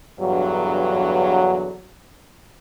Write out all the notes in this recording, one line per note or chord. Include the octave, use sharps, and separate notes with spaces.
E2 G2 D3 F#3